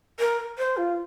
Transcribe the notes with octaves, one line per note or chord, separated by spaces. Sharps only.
A#4
C5
F4